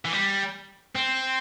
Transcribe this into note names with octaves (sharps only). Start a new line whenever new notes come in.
E3
G3
C4